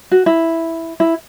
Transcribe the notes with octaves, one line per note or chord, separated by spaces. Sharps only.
F#4
E4
E4